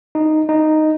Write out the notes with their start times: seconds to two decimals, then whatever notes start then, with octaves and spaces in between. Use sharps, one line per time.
0.15 D#4
0.49 D#4